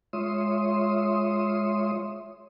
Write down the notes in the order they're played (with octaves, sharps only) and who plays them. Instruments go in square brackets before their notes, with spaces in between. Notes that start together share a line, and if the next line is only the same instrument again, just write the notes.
[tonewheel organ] G#3 F4 C#5 E5 C6 D#6